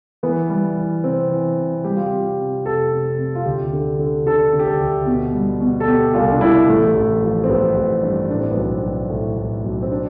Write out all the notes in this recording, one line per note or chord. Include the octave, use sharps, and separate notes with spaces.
E3 B3
G3
E3
C3 C4
E3
C3
G3 G4
F4
C3 G4
C3
F1 A4
C3
C3
F4
D2 G4
D3
D3
D3 A4
D3
G4
A4
D2
B2
G3
B2
A4
B2 G4
C2 F4
D4
C2 E4
A1 A3
A1
F3
C4
A1 B3
A1
G2
A2 D4
C4
B1 B3
C4
B1
A2
A2
B1
C4
D4